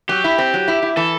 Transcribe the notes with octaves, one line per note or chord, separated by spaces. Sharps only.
F#3 G4
E4
C4
F#3
E4
E4
E3 A4